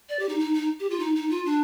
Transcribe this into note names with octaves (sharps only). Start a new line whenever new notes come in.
D5
G4
D#4
D#4
D#4
G4
F4
D#4
D#4
F4
D4